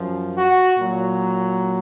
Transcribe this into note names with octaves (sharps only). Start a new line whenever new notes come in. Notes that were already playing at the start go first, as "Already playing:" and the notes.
Already playing: F#2 F3
F#4
A#2 F#3